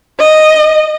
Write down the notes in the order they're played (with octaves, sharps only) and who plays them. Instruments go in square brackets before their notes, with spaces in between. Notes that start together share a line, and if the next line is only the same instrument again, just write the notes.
[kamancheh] D#5